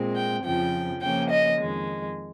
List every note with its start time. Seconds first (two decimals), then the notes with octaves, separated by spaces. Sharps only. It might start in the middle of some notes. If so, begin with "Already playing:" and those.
Already playing: A#2 G#3 C4
0.16 G5
0.44 F2 C#3 F3 G5
1.01 C#3 F3 A#3 C#4 G5
1.29 D#5
1.59 F2 D#3 G#3